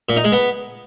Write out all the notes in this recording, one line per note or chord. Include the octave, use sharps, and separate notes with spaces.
A#2
D#4
G#3
B3